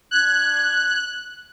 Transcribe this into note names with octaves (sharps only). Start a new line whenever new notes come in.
D4 F#6 G#6